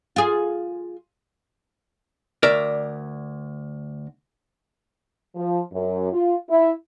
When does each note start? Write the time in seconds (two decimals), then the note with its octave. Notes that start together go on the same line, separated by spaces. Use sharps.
0.16 F4 G#4
2.43 D2 A#4 D5 E5
5.36 F3
5.73 F#2
6.12 F4
6.49 E4